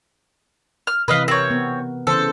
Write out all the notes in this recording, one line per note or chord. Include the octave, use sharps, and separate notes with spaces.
F6
C3 E3 B4 D#5 F5
C4 A#4 C#5
B3
C#3 E3 A4 C5